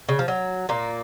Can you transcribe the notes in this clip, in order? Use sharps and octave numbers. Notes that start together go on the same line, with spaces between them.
C#3
F3
F#3
A#2 A#3